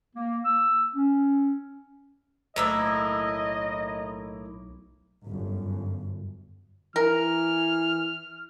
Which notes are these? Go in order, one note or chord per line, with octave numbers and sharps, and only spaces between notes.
A#3
E6
C#4
B1 A2 A#3 E4 D#5
G1 F#2
E3 A#4 F6